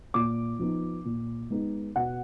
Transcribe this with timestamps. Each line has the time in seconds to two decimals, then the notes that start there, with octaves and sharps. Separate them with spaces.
0.14 A#2 D6
0.59 F3 B3 D#4
1.05 A#2
1.50 G#3 B3 D#4
1.96 B2 F#5